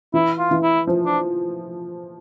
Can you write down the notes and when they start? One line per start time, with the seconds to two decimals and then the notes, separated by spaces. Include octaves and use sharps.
0.14 E3 E4
0.39 F4
0.51 E3
0.63 E4
0.87 F3
1.06 D4